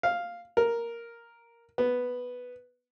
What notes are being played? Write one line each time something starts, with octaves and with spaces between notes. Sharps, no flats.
F5
A#4
B3